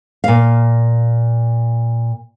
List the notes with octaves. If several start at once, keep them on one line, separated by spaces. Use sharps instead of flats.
A#2 F5